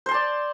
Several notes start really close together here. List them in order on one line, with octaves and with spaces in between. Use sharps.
C5 C6 A5 D5